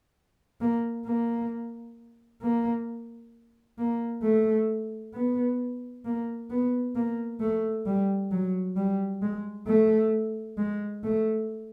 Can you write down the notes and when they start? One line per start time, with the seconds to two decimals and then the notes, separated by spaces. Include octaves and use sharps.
0.61 A#3
1.06 A#3
2.42 A#3
3.78 A#3
4.23 A3
5.14 B3
6.05 A#3
6.50 B3
6.95 A#3
7.41 A3
7.86 G3
8.32 F#3
8.76 G3
9.22 G#3
9.67 A3
10.58 G#3
11.04 A3